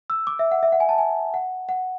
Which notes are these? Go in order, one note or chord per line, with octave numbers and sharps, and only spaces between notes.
E6
D6
E5
F#5
E5
F#5
G#5
A5
G#5
F#5
F#5